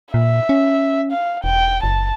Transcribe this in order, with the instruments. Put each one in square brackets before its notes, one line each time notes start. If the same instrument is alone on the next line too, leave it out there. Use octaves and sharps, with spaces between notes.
[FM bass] A#2 [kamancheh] E5
[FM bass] C#4
[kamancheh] F5
[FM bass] E1 [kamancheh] G5
[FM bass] F#1 [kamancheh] A5